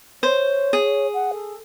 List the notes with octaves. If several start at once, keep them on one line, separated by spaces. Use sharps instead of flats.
C5 C#5
G#4
F#5
A4